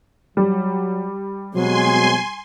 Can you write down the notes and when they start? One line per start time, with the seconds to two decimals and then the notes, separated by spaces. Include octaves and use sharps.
0.37 F#3 G3
1.53 B2 F#3 G#3 C4 G#5 C6